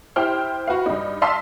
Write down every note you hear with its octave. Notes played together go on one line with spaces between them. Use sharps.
E4 G4 C5 G5 F6
F#4 B4 F5
G2 D#4
D#5 F5 A5 C6 E6 B6